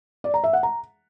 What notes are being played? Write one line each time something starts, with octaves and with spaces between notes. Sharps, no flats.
D5
A#5
E5
F#5
A#5